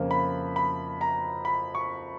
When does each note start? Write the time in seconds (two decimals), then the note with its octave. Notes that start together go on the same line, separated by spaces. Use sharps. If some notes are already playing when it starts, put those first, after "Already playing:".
Already playing: F2 C#3 F3 A#3
0.11 B5
0.56 B5
1.01 A#5
1.45 B5
1.75 C#6